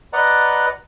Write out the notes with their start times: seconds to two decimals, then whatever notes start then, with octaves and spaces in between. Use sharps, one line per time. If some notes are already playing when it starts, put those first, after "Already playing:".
0.13 B4 D5 D#5 F#5 A#5